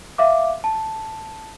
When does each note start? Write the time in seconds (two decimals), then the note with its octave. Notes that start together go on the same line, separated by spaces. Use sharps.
0.18 E5 F5 D6
0.64 A5